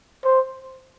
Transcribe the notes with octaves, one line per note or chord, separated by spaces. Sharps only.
C5